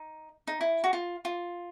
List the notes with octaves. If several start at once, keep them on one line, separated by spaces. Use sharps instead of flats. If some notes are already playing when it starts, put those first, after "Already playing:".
Already playing: D#4
D#4
E4
F#4
F4
F4